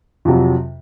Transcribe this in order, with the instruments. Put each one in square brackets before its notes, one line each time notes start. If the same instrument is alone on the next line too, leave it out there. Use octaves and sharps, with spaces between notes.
[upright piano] F2 C3 F#3